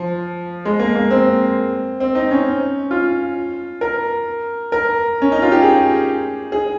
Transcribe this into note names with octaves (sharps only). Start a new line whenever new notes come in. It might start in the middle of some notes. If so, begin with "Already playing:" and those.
Already playing: F3
G#3
A#3
A#3
C4
C4
D#4
C#4
F4
A#4
A#4
C#4
D#4
F4
G4
G#4
G#4